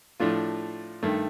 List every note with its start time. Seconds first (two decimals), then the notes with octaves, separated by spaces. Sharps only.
0.20 A2 F3 A3 D4 F4
1.03 G2 D#3 A3